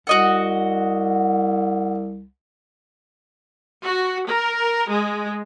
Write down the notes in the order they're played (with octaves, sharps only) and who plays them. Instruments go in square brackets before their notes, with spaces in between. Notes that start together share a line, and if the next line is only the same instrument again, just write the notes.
[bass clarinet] C2 [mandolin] F#4 D#5 F#5
[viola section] F#4
A#4
G#3